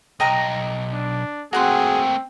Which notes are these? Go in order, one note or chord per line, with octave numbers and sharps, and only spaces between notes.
B1 D#5 G5 A#5
D4
A3 A#3 C4 F#4 G#4 F#5 C6